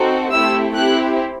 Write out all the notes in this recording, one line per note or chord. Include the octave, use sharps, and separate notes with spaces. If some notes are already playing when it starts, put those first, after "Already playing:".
Already playing: C4 D#4 F#4 A4
A3 C4 E4 G4 E6
C4 E4 G4 F#6